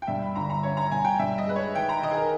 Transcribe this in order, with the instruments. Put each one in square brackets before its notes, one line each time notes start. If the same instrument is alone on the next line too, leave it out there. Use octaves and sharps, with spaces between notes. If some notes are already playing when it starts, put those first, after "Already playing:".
[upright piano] G5
[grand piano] G2 [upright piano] E5
[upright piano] B5
[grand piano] G1 [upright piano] A#5
[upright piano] A#5
[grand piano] C#4 [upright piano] C#5
[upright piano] A#5
[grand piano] G2 [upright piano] G#5
[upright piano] G5
[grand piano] G2 [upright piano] E5
[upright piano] D#5
[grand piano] G#3 [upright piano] B4
[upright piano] C#5
[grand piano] D#3 [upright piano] G5
[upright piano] A#5
[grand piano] D#3 [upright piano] D#5
[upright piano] G#4
A#4